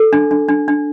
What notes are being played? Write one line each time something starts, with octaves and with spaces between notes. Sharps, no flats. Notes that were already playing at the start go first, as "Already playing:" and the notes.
Already playing: A4
D4
D4
D4
D4